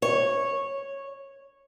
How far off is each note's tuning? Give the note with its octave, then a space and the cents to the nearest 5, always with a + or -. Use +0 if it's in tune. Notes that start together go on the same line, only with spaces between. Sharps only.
C#5 -10